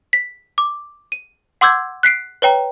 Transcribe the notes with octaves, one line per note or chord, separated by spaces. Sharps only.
B6
D6
D#7
F#5 C6 D6 E6 G6 G#6
F#6 B6 C7 D7
B4 C#5 G5 A#5